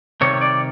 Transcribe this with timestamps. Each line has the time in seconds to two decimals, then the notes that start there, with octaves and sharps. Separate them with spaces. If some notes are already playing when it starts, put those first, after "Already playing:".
0.21 C3 D#3 G3 C#5
0.41 D5